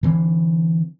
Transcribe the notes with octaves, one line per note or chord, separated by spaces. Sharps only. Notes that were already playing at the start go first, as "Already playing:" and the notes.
D3 E3 C4